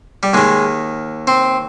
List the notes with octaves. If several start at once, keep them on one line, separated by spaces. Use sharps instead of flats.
G3
D#2 D#3 G#3
C4